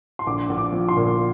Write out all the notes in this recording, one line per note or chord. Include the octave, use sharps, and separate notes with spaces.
C6
A#1 D6
A#1
D6
F3
C6
A#2